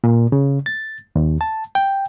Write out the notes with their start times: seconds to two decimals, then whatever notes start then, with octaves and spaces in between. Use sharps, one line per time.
0.04 A#2
0.32 C#3
0.66 A6
1.16 D#2
1.41 A5
1.75 G5